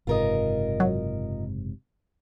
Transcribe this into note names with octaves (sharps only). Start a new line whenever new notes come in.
F#1 G#2 C3 F4 A#4 D#5
F#3